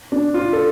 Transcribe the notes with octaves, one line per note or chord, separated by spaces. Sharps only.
D4
F4
A4